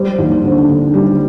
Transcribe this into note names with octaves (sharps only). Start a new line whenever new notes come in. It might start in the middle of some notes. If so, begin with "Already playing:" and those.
Already playing: G3 C5
D#2
C5
D3
D3
G3